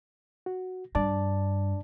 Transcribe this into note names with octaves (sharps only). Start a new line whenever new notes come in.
F#4
G2 D4 D5 A5